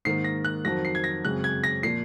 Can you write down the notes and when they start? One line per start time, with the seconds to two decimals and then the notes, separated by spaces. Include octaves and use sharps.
0.05 G#2 D#3 A#3 C7
0.24 A#6
0.45 F#6
0.65 F2 D#3 F#3 A#6
0.85 C7
0.95 G#6
1.04 A#6
1.24 F#2 C#3 G#3 C4 F#6
1.44 G#6
1.64 A#6
1.83 A#2 F3 A#3 C7